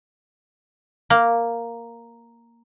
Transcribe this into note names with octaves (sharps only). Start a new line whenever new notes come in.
A#3